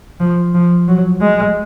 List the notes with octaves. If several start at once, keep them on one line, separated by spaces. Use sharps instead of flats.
F3
F3
F#3
G#3